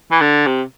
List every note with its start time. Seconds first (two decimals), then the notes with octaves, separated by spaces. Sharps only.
0.12 E3
0.21 D3
0.47 C3